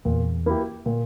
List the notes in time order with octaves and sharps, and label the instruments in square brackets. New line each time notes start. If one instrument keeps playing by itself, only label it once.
[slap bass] E2 [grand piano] A#2
[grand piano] A#3 E4 G4
A#2